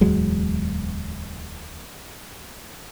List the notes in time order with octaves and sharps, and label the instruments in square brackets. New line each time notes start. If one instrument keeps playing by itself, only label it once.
[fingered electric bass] D1 E2 F#3 G#3